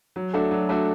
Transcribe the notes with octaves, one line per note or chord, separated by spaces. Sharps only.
F#3
A3 D4 F#4 A4
F#3
A3 D4 F#4 A4